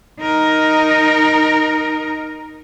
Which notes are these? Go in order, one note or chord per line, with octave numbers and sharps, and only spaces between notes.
D#4 A#4